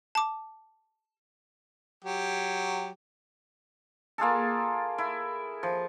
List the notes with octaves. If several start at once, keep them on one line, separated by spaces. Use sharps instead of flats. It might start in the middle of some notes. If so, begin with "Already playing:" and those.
A5 D6
F#3 G4
A#3 F4 G#4 A4
E4
F3